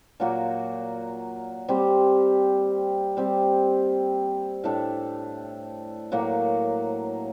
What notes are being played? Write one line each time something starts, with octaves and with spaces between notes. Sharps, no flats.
A#2 F#3 A#3 F#4
G3 C4 G4
G3 C4 G4
A2 A3 D4
A2 F#3 A#3 F#4